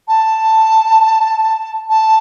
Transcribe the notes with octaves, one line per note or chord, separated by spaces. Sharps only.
A5
A5